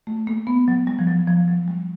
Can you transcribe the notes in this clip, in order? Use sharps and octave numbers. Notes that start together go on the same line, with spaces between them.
A3
A#3
B3
F#3
G3
F3
F#3
F3
F#3
G3